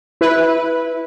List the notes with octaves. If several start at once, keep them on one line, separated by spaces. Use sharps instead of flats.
E4 B4